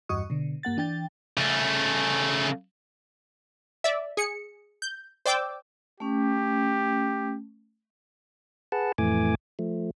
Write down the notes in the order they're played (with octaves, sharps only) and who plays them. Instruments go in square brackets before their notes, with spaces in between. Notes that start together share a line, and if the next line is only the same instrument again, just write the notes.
[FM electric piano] E2 G2 F#4 D#5 C#6 D#6
B2 D3
G2 A#3 F#5 A6
E3 D4 G5 A6
[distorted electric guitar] C#3 A3
[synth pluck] D5 E5
G#4 C#7
G6
C5 D5 G5 D6 E6 G6
[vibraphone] A3 C#4 [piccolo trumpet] G4
[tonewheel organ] G#4 B4 F#5 A5
F2 A2 E3 A3 G#5 D6
F3 A3